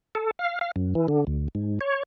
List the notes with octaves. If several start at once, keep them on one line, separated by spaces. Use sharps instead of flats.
A4
F5
F5
F#2
E3
D3
D2
G#2
C#5